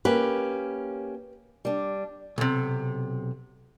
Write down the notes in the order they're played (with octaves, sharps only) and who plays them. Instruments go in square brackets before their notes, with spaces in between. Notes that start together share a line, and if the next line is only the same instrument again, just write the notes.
[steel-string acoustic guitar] A#3 C#4 G4 [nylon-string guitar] B4
[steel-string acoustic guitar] G3 D4
[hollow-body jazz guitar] B1 C3